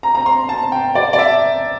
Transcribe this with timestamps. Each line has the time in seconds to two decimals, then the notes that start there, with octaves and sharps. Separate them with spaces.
0.03 A#5
0.15 A#5
0.26 C6
0.49 A5
0.72 G5
0.95 D5
1.13 D5
1.18 E5